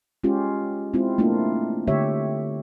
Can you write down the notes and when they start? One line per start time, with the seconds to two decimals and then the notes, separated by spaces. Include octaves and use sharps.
0.24 G#3 C#4 F4 G4
0.93 G#3 C4 E4 F4
1.18 A3 A#3 D4 E4 F4
1.88 D3 A3 G4 C#5 E5